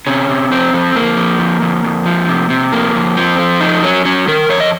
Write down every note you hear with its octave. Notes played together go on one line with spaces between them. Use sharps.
C3 C#4
C3
F2 C4
F2
F2 A#3
F3
F2
F2
F2
F3
C3
C3
F2 A#3
F2
F3 C4
F3
F2 D#4
F#3 C#4
F#3 C#4
D#3 A#4
F2 C#5
D#5